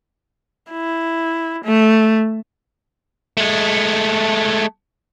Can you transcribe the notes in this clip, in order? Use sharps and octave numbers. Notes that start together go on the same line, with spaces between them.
E4
A3
G#3 A3